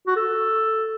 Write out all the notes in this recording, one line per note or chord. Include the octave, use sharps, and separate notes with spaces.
F#4
A4